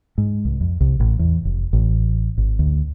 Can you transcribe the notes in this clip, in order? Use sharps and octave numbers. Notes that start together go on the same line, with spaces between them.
G#2
C2
F2
C2
A1
E2
F1
A1
G#1
D2